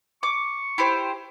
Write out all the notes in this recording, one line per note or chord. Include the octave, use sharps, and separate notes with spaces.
C#6 D6
E4 G4 C5